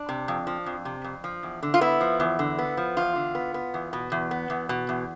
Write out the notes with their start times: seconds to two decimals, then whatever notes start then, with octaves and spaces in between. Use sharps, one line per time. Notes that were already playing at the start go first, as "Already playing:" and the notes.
Already playing: D4
0.09 C3
0.28 F2
0.47 F3
0.66 F2
0.85 C3
1.04 F2
1.24 F3
1.43 E2
1.63 D3
1.74 F4
1.81 B3 E4
2.01 F3
2.20 E2
2.39 D3
2.59 B3
2.77 F3
2.97 E2 F4
3.15 D3
3.35 B3
3.54 B3
3.74 E2
3.93 B2
4.12 E2
4.31 B3
4.50 E2
4.69 B2
4.89 E2